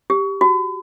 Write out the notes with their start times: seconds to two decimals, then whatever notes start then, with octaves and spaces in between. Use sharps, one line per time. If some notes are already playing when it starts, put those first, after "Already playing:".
0.10 G4
0.41 F#4